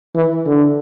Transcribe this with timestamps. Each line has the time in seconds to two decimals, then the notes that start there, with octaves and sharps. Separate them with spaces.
0.15 E3
0.45 D3